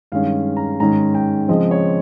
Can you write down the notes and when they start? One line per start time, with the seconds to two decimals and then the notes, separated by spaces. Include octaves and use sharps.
0.12 G2 D#3 G#3 C#4 F5
0.57 A#5
0.80 G#2 D#3 G#3 C#4 A#5
1.15 G5
1.48 C#3 F3 G#3 C4 D#5
1.71 C#5